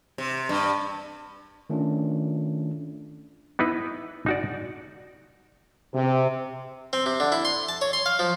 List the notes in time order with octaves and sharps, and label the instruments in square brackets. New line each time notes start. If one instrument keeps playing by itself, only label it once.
[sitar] C3
G2
[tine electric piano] D#3 A3 C#4 D4 F4
[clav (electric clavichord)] B3 D#4 E4 B4
D#4 F#4 D5
[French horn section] C3
[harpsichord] C4
C3
D3
E4
C6
A5
C#5
C6
F5
F3